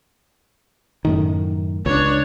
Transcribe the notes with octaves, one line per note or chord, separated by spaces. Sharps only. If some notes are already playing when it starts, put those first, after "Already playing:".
F#2 A2 D#3
C#2 D4 C#5